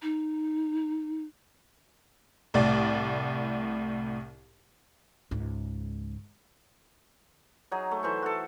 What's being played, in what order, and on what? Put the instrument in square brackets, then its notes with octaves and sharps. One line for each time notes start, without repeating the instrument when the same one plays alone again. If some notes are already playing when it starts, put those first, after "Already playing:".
[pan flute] D#4
[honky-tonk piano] C2 A2 D5
[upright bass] C#2 G#2
[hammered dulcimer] F#3 D#4 G#4
A3
E3 C5 C#6
F#4 A4